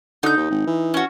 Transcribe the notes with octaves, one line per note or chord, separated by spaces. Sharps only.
D3 D#4 G6
D#2
G#1
E3
C#4 F#4